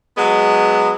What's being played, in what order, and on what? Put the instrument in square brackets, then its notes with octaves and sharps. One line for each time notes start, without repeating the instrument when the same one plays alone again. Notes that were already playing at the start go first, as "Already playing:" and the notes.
[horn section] F#3 G#3 B3